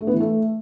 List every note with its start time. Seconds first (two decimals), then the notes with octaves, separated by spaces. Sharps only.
0.01 A3
0.07 B3
0.14 E3
0.20 A3